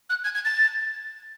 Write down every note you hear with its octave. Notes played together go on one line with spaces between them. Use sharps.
F#6
G#6
G#6
A6